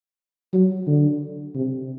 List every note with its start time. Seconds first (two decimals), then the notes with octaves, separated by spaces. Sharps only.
0.53 F#3
0.87 D3
1.55 C3